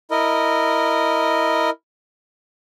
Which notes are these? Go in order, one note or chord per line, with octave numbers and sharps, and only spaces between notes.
E4 A#4 D#5